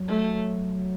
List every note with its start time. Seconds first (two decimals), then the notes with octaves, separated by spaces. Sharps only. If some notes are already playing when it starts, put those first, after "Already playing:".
Already playing: F#3
0.08 A3